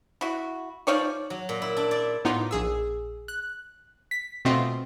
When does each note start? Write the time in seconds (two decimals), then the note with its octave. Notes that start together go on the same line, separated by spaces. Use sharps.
0.21 E4 F#4
0.87 F3 D#4 C#5 D5
1.30 F#3
1.49 A#2
1.62 E4
1.77 D4
1.91 D5
2.25 A2 B3 D#4 F4 D6
2.51 A#1 G#4 E6
3.28 F#6
4.11 B6
4.45 B2 A3 B3 C4 F4 D#5